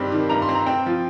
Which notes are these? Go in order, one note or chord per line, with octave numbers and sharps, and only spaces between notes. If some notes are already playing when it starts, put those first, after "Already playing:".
Already playing: G2 D#3 G3 C4
D#3
G2 A#5
C6
C4
A#5
C4 G5
F3